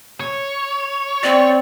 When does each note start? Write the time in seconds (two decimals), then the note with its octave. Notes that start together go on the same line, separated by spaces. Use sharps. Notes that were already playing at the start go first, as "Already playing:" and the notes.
0.20 C#5
1.23 C4 D5